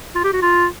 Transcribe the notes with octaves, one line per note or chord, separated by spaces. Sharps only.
F4
G4
F#4
F4